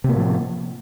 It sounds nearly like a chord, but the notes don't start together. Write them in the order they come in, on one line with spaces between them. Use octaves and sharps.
C3 A#3 A2 F3